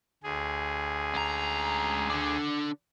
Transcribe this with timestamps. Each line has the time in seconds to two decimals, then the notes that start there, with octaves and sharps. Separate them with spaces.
0.24 D2 G#4
1.14 C#2 A#5
2.10 D3 D4